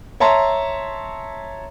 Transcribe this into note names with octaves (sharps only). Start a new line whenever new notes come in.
C#5 E5 A5 A#5 C6